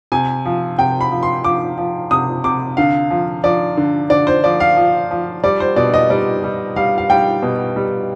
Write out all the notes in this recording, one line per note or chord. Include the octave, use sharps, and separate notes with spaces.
C3 G#5
F3
C3 G5
B5
F3
C6
F3 D6
F3
C3 D#6
C3 D6
D3 F5
F3
F3 D5
D3
D3 D5
C5
F3 D5
F5
F3
F3
G3 D5
C5
B2 D5
D#5
G3 D5
G3
G3 F5
F5
G3 G5
B2
G3